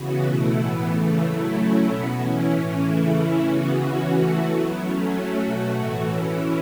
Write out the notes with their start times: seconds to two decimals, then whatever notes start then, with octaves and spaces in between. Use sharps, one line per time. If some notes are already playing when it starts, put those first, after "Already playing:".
Already playing: C#3 E3 B3 F#4
0.25 B2 A3 E4
0.57 A2 E3 B3
0.89 C#3 E3 A3
1.22 F#3 A3 E4
1.54 F#3 A3 C#4 E4
1.86 B2 B3 F#4
2.19 E3 C#4 E4
2.51 A2 E3 C#4
2.84 C#3 E3 A3 E4
3.16 E3 C#4 E4
3.48 C#3 E3 B3 F#4
3.81 E3 C#4 F#4
4.13 E3 A3 F#4
4.45 F#3 B3 E4
4.78 F#3 A3 C#4
5.10 F#3 A3 C#4 F#4
5.43 B2 A3 F#4
5.75 A2 E3 A3 F#4
6.07 E3 C#4 E4